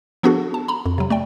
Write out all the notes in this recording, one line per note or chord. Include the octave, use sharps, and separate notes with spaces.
F3 B3 D4 F#4 G#4 A4
A5
A#5 B5
F2
C3 F#3
A3 D5 G5